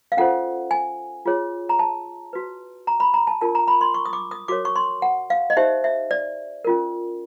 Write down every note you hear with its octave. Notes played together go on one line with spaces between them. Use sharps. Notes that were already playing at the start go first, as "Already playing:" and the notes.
F5
C#4 F4 A4 C5 F#5
G#5
F4 G#4 C#5
A#5
A5
F#4 B4
A#5
B5
A#5
A5
D4 F4 A#4 A5
A#5
B5
C6
C#6
D#6
D6
D#6
F#4 A#4 C#5 D6
C#6
C6
F#5
F5
D#5
D#4 G4 C5 E5
E5
D5
C#4 F4 A#4